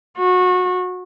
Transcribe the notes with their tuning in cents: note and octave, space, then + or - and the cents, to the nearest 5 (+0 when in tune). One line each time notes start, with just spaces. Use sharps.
F#4 -25